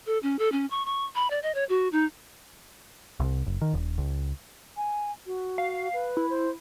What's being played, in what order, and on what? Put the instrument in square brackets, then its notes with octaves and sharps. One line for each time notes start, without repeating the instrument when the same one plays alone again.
[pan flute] A4
C#4
A4
C#4
C#6
C#6
B5
D5
D#5
C#5
F#4
D#4
[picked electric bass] C2
F#1
D#3
D#1
C#2
[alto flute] G#5
F#4
[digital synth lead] F5
[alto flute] B4
[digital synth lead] E4
[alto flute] C5